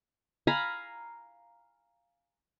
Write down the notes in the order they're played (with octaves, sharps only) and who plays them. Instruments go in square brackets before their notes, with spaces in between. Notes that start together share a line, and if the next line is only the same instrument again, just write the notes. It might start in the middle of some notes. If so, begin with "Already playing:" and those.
[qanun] F5 G#5 A#5 B5